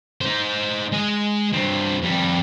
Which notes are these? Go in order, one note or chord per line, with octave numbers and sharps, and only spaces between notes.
D#4 C5
G#3 D#5
G2 C4
F2 G3